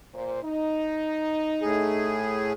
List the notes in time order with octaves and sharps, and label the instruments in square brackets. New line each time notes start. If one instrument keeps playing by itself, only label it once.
[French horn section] A#2 C5
D#4
[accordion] A2 G#4